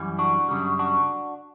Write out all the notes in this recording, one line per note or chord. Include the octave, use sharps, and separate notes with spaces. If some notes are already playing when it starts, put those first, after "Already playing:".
Already playing: F#2 E3 G3
D4 F#4
F#2 C#3 G3
D4 F#4